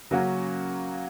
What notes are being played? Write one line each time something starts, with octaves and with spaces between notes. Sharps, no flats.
C#3 F#3 A#3 C#4 F#4